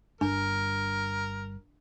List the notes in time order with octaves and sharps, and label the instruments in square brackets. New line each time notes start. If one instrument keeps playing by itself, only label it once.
[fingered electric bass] G1 G2 [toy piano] D4 [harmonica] A#4